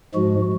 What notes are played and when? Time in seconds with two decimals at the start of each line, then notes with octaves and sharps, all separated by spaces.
0.14 G#2 F3 G#3 F#4